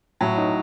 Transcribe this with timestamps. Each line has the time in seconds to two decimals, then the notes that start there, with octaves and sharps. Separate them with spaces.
0.21 A2 F#3
0.37 D#4